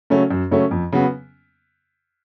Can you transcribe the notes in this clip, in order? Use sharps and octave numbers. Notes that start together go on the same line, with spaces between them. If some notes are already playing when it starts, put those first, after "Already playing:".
C#3 F#3 A3 C#4
F#2
C#3 F#3 A3 C#4
F2
C#3 F#3 B3